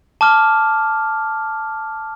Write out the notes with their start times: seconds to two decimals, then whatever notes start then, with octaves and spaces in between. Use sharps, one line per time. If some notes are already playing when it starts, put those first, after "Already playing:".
0.21 A5 D6 F6